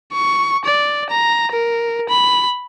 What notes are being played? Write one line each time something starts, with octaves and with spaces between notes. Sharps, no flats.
C#6
D5
A#5
A#4
B5